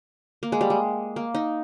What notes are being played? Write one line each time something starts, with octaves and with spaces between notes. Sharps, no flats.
A#3
G#3
G3
G#3
A#3
D#4